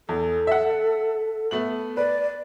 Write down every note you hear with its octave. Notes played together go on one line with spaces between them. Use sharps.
E2 A4
E5 F#5
A3 B3 F#7
B4 D5